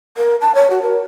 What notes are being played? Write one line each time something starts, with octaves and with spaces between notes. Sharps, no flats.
A#4
A5
C#5
F#4
A#4